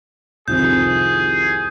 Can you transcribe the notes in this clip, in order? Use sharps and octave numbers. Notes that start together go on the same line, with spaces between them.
C2 F2 D#3 G#4 G6